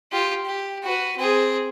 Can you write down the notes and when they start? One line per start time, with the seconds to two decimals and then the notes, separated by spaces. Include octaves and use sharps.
0.12 F4 G4
0.45 G4
0.83 F#4 B4
1.17 C4 G#4